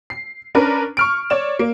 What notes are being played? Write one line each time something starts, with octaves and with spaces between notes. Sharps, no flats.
C7
C#4 D4 A#4 B4
C#6 F6 D7
C#5 D5 E7
A#3